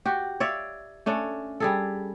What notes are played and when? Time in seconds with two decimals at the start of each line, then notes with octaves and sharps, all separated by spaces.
0.05 F#4 G4
0.40 C#5 D5 E5 F5
1.06 A3 C#4 D4
1.60 G3 G#4 A4